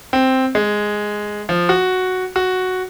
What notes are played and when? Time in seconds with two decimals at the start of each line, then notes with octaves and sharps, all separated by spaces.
0.13 C4
0.55 G#3
1.49 F3
1.69 F#4
2.36 F#4